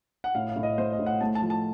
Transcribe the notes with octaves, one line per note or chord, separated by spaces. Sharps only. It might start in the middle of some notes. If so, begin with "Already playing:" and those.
F#5
A2 F5
F5
A2
D#5
A3 C5
D#5
A2
F#5
A3 A5
A5
F3
A5